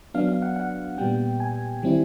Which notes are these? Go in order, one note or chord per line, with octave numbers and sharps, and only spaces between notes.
F#3 B3 D4 F5
F5
F#5
F#5
A#2 G3 B3 G5
G#5
D#3 G3 C4 E4